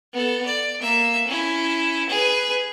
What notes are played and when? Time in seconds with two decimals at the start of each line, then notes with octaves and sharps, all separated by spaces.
0.13 B3 A4
0.46 D5
0.80 A#3 E5
1.27 C#4 E4
2.09 G#4 B4